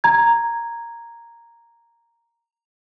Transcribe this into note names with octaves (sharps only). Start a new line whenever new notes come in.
A#5 G#6